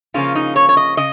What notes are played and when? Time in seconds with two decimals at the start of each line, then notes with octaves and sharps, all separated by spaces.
0.14 C#3 F3 A#3 C#4 F4
0.35 D#4
0.56 C#5
0.69 C#5
0.77 D#5
0.97 C#3 D#5